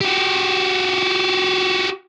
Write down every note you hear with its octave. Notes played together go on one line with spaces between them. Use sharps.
F#4 G4